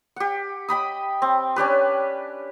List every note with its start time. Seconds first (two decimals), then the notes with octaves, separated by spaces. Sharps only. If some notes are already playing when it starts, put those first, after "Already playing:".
0.16 G4 F#5
0.68 D#5 G5 B5 D#6
1.22 C4
1.56 C#4 D4 G4 B4